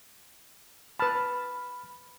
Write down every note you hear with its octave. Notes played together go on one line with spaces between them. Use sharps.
B4 A5 B5 F6